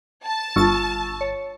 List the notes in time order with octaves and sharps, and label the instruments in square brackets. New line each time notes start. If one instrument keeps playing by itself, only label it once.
[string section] A5
[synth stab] G1 A6 [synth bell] F4 C#6 E6
[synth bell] C#5